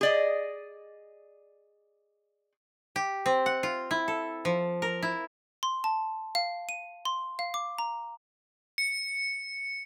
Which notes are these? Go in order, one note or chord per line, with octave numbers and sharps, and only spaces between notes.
G#4 D5 D#5
G4
C4
F#5
F4
E4
A4
F3
A#4
E4
C6
A5
F5
D#7
C6
F5
D6
A#5
C#7